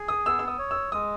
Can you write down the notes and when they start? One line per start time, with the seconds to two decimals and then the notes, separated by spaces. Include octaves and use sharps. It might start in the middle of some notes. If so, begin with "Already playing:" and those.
Already playing: G#4
0.08 D#6
0.25 B3 E6
0.39 E6
0.48 D#6
0.59 C#5
0.71 E6
0.92 G#3 D#6